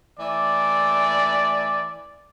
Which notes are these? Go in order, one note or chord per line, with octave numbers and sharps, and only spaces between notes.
E3 A3 D5